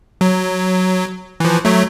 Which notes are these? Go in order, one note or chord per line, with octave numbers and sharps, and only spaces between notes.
F#3
E3 F3
F#3 A3